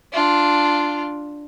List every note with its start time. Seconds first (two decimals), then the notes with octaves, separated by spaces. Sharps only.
0.12 D4 F4